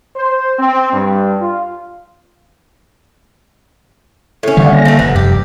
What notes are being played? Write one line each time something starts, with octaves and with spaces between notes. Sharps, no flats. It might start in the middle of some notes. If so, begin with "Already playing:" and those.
C5
C4
G2
F4
A2 C#4
D3 D#3 G3 D5 F5 F#5
A#3 A#6
F3 A3
F1 G2 B3
F#2 G4